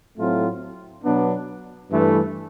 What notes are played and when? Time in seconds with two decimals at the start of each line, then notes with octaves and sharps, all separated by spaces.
0.18 A2 F#3 A3 C4 F4
1.04 B2 F#3 B3 D4
1.90 G2 E3 A3